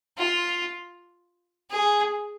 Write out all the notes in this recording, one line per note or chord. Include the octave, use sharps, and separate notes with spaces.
F4
G#4